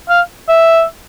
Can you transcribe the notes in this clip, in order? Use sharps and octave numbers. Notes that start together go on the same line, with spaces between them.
F5
E5